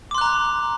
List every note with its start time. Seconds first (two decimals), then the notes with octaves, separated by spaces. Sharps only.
0.11 D6
0.15 C6
0.18 F#6
0.21 A#5